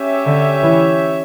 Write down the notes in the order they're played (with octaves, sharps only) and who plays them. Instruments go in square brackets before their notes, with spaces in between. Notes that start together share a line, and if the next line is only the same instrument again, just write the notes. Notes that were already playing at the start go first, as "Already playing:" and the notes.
Already playing: [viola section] C#4 G4 C#5 E5
[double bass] D3
E3